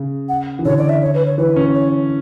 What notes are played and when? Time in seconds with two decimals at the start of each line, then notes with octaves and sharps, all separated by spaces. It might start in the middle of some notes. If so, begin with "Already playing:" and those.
Already playing: C#3
0.29 F#5
0.59 E3
0.65 D3 C#5
0.78 D5
0.89 E5
1.02 C#5
1.14 B4
1.26 C#5
1.38 E3 B4
1.56 C#4
1.75 C#5